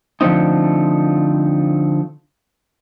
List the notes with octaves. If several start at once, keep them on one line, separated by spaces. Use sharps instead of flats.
D3 F3 A3 C4 D#4